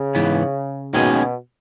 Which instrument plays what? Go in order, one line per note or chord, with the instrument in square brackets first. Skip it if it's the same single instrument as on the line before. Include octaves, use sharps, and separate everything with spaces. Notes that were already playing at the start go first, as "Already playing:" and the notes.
Already playing: [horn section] C#3
[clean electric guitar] G#2 E3 B3
[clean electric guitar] D#2 D#3 G#3 C#4 G#4 [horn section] B2